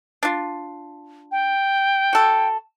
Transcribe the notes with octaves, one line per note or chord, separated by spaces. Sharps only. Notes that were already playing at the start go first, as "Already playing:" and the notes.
D4 F4
G5
F#4 A4